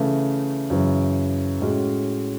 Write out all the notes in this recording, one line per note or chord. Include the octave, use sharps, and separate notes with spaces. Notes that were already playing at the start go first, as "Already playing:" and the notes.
Already playing: C#3 E3 A3
F#2 C#3 E3
A2 G#3 C#4 F#4